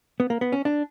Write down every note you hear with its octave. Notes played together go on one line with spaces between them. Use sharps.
B3
A#3
B3
C#4
D4